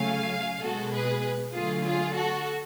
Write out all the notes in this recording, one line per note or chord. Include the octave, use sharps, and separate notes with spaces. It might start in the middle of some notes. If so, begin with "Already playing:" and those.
Already playing: C#3 F#3 A3 F5 G#5
B2 G#3 F#4 A4
G#4 B4
D3 F#3 A3 F4 G#4
F4 G#4
F#4 A4